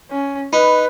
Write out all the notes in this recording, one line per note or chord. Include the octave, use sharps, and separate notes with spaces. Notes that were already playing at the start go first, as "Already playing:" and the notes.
C#4
D#4 B4 B5 F#6